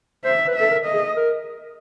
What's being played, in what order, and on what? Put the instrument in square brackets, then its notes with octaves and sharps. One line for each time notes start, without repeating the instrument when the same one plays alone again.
[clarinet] C5 [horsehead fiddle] E5
[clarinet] B4
[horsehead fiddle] E5
[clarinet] A4
A#4
[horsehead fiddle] D#5
[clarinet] G#4
A#4